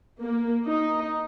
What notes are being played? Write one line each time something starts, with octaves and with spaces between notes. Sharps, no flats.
A#3
D#4